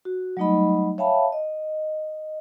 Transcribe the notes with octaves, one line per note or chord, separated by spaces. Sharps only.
F#4
F#3 G3 A3 D#4 D#5 B5
C#5 E5 F5 G5 A5 B5
D#5